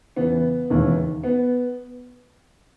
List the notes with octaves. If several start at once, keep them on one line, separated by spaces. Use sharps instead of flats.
E2 C#3 E3 B3
E1 D#2 C#3 E3
B3